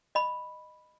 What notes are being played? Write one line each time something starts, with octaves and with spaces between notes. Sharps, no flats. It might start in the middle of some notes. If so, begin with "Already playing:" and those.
D#5 B5